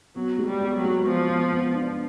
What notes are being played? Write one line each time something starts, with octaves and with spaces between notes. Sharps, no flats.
F#3 B3
G#3
G3
B3
F#3
G#3
F3 B3
B3
B3
D4